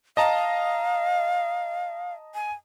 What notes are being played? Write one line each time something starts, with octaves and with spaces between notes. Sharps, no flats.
D#5 F5 A5 A#5
G#5